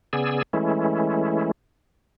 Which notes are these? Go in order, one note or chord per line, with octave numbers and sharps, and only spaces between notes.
C#3 B3 G#4 D5 G#5 E6
E3 G#3 A3 C#4 E4